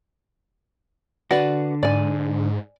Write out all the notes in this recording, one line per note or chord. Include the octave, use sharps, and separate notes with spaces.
D3 F#4 B4 D5
G#2 D5 G#5